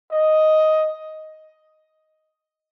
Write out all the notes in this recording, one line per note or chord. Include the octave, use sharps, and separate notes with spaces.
D#5